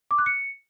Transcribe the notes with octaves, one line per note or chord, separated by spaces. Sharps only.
D6
F#6
C#7